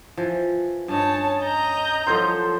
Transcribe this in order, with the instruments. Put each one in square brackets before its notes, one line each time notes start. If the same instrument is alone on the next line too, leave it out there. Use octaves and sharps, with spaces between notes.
[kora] E3 F3
[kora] G2 C#4 D#4 [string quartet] C#5 A5
[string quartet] D#5 A#5 G6
[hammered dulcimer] F3 A4 C5 [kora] F#3 A#3